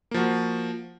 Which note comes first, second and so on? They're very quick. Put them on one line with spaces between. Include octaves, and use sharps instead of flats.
A#3 F3 F#4